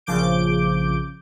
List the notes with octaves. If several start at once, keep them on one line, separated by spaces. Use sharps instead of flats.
A#1 C#3 F3 D6 G6 D7